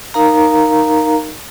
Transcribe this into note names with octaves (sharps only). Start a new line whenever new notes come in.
D#4 A#4 F5 A#5